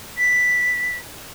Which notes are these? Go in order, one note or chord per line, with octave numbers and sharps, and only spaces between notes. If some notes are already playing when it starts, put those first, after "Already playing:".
B6